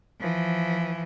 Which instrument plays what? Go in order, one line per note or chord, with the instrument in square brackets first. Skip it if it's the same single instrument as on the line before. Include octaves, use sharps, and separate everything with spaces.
[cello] E3 F3